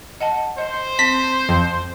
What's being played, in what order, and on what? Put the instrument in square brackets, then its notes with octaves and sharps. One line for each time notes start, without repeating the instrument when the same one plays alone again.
[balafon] D#5 F#5 A5
[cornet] C5 [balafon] D#5
[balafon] C4 [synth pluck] B6
[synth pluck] F2